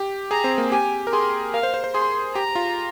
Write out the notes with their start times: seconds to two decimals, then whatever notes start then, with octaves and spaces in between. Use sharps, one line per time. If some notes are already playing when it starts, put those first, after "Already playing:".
Already playing: G4
0.31 G#4 A#5
0.44 C4
0.58 A#3
0.72 G4 G#5
1.07 A#4
1.13 G#4 C6
1.54 A#4 F5
1.63 C5
1.74 C5
1.84 C5
1.94 G#4 C6
2.35 G4 A#5
2.55 F4